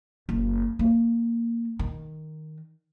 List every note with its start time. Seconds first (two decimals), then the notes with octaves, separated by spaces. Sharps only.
0.29 F#1
0.79 A#3
1.79 D#3